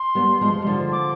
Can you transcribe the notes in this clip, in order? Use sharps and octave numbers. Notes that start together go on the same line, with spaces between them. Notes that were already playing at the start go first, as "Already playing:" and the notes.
Already playing: C6
G3 B3
F3 G#3
G3
D3 F3
D6